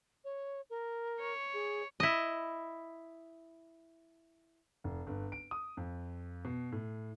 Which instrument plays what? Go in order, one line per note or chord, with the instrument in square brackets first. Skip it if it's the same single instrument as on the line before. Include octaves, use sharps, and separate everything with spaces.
[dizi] C#5
A#4
[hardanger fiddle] C#5
[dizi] G#4
[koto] E4 D#5
[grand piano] F1
G1
D7
D#6
F2
B2
A2